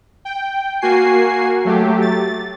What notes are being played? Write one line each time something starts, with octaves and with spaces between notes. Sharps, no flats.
G5
A#3 F#4 G#5 C7
F#3 A3 G4
A6